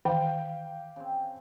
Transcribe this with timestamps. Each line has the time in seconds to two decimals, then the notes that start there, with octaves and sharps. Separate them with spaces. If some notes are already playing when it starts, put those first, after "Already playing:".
0.05 D#3 E3 G4 F5 G5
0.96 C#3 C4